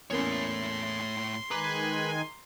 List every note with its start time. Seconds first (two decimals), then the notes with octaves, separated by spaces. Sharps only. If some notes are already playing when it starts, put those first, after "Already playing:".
0.10 E2 A2 A#3 C#4 C#5 C6
1.51 D#3 G#3 B4 G#5 A#5 B5 D6